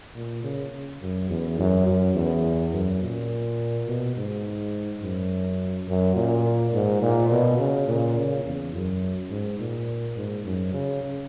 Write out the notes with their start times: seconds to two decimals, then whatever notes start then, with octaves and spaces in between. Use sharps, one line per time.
0.15 A#2
0.44 C#3
1.02 F#2
1.30 E2
1.59 F#2
1.87 F#2
2.15 E2
2.74 F#2
3.02 A#2
3.87 B2
4.16 G#2
5.02 F#2
5.88 F#2
6.16 A#2
6.73 G#2
7.02 A#2
7.31 B2
7.59 C#3
7.88 A#2
8.17 C#3
8.45 E2
8.74 F#2
9.31 G#2
9.60 A#2
10.17 G#2
10.45 F#2
10.74 C#3